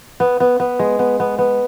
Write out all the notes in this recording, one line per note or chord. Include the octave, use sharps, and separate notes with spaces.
B3
B3
B3
G#3
B3
B3
B3